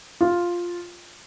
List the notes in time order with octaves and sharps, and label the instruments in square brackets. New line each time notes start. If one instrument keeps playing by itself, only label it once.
[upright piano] F4